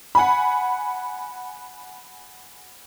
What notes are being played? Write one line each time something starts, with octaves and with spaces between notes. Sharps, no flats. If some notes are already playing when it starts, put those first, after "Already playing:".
F#5 G#5 B5